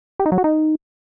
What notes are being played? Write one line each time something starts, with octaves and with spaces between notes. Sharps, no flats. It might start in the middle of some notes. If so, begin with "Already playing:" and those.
G4
D#4
F#3
F#4
D#4